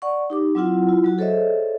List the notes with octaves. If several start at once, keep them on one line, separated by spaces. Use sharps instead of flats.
D5 F#5 C#6
D#4 G4 D6
F#3 C4 E4 F4 F#5
E4 F4
F#3 F#4
G#4 A4 C5 C#5 D#5 E5